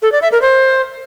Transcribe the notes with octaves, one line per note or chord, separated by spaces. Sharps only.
A4
D5
E5
A#4
C5